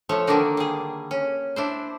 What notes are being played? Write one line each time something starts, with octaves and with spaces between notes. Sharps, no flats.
F3 A3 C#5
D3 D#3 A#3 D4 D#4
G3 G#4
C#4
D4 E4 C5